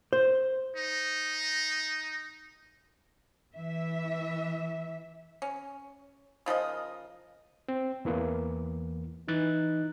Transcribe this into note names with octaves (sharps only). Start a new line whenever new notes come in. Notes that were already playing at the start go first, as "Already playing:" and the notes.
C5
D#4
E3 E5
C#4
C#3 F3 A#4 D#5
C4
E2 E3 A#3
E3 D#4 F#6 A6